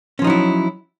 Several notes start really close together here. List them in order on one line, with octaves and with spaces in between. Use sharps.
C#4 F3 D#4 F#3 E4